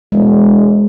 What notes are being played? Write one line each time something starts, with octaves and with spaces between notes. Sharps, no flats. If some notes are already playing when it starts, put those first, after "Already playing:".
E1 G#3